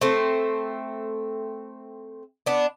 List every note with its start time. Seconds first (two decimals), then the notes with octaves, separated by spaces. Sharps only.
0.01 A3 C4
2.46 B3 D4